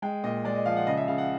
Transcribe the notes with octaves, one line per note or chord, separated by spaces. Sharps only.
G#3 G5
A#2 D#5
G#3 D5
D#5
F3 F5
F#5
C#3 D#5
E5
C#3 F5
F#5